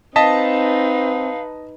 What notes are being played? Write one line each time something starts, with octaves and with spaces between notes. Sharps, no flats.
C4 D#4 B4 D#5 F5 A5 B6